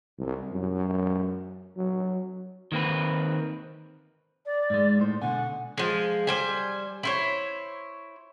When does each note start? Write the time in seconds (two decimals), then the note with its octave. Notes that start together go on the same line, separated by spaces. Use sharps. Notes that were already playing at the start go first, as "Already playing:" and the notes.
0.19 C2
0.52 F#2
1.77 F#3
2.72 D#3 A#3 C4 B4
4.46 D5
4.70 G#2 G#3
4.99 A2 C5
5.22 B2 D3 F#5 G#5
5.78 F3 G#3
6.27 G3 C5 G#5
7.03 E4 C5 C#5